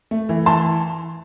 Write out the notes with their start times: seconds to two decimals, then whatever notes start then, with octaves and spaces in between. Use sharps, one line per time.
0.11 A3
0.29 E3
0.46 E3 A5 C6